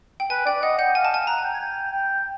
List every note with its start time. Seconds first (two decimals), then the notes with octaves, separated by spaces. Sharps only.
0.20 G5
0.30 B4 G#5
0.46 D5 G5
0.63 D#5 F#5
0.78 F#5 G5
0.95 F5 G#5
1.05 A5
1.11 F5 G#5
1.27 F#5 A#5
1.44 G5
1.54 G#5
1.60 G5
1.92 G5